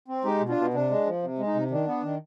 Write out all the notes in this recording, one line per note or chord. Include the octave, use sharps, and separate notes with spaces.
C4
G#3 D#4 G4
B2
D4 F4
B2
C3 D4
G#3
F3
C3
G#3
D#4
C3
D#3 D4
B3
D#3